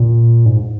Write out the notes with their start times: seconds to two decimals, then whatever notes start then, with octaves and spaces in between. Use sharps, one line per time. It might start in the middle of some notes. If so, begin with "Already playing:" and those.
Already playing: A#2
0.46 G#2